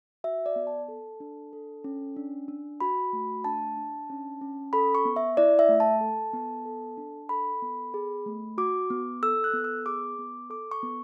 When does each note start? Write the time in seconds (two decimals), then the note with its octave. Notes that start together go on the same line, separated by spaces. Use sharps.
0.24 F#4 E5
0.46 D5
0.56 B3
0.67 A5
0.88 A4
1.20 D4
1.53 A4
1.84 C#4
2.16 D4
2.48 D4
2.80 F#4 B5
3.13 A3
3.44 D4 A5
3.77 D4
4.10 C#4
4.41 C#4
4.73 A4 B5
4.95 C#6
5.05 B3
5.16 E5
5.37 E4 D5
5.59 E5
5.69 A3
5.80 A5
6.01 A4
6.33 B3
6.65 A4
6.97 D4
7.29 A4 B5
7.62 B3
7.94 G#4
8.26 A3
8.58 F#4 D6
8.90 B3
9.23 A4 E6
9.44 F#6
9.54 B3
9.64 E6
9.86 G#4 D6
10.19 B3
10.50 A4 D6
10.71 C#6
10.83 B3